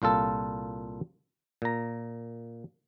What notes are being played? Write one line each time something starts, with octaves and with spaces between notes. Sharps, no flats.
C2 A#2 F4 A4
A#2 A#5